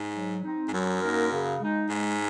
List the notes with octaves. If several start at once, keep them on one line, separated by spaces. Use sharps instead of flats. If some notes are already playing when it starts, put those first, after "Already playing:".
Already playing: G#2
F#3
C4 D#4
G#2
F#2 F#3
A#3 D#4 A#4
C#3
G#3 D#4
G#2 G#3